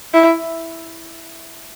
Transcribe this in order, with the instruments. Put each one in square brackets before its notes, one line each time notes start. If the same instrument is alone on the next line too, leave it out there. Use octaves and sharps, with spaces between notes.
[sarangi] E4